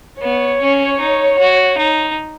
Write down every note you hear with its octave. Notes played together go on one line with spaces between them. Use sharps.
B3 C#5
C#4
D#4
F#4
D#4